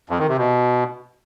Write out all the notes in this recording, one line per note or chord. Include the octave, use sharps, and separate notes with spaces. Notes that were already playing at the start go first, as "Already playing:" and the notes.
F2
D#3
C3
B2